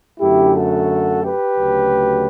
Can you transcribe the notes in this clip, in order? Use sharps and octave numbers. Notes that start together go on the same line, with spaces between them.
F#2 D3 A3 E4 G4
F#4 A4
G4 B4
D2 C#3 F#3 A3